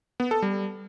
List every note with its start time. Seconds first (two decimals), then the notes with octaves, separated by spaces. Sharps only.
0.20 B3
0.31 A4
0.42 G3